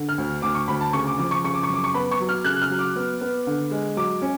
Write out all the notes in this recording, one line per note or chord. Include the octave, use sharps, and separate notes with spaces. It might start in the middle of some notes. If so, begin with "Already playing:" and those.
Already playing: D3
F6
D2
D2 D6
C#6
D2 B5
A5
C#3 C#6
D6
F3 D6
C#6
C#3 C#6
D6
C#6
F#2
D6
C#6
B3 B5
C#6
F#3
F6
C#3 F#6
F6
F#3
D6
B3
B3
D3
G#3
F#3 D6
C#4